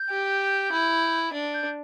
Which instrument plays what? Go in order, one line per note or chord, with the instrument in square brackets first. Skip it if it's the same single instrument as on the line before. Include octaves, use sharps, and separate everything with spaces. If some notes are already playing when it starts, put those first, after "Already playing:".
Already playing: [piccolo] G6
[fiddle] G4
E4
D4
[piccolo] G6